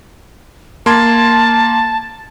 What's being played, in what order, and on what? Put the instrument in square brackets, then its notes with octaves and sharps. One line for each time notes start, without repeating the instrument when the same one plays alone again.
[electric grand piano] A#3 C6 G#6 [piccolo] A5